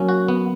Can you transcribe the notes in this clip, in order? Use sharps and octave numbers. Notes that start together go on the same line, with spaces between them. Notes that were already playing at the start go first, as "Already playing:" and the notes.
Already playing: F#3 A#3 C#4
F#4
B3